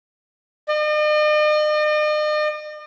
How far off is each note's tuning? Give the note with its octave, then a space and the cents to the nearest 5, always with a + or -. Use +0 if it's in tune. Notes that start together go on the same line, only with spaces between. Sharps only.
D#5 -45